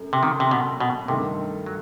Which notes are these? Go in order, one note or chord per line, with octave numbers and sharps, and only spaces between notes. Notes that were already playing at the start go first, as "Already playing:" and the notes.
Already playing: F#2 A3
C3
D#3
C3
B2
B2
G2 C3 D#3 A3
F#3